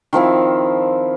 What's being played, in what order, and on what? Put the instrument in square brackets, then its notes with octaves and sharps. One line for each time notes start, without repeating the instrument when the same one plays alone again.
[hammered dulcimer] D#3 F3 C4 E4